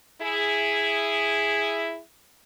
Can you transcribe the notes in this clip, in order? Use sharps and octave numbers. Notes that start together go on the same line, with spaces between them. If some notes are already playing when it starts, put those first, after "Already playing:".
E4 G#4